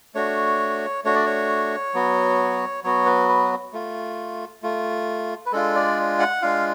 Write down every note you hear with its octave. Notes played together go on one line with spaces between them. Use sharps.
A3 D4 F#4 C#5
A3 D4 F#4 C#5
D5
C#5
F#3 B3 F#4
F#3 B3 F#4 C#5
B4
B4
A3 F4
A3 F4
B4
G#3 D4 F4 A4
D5
F#5
G#3 D4 F4 F5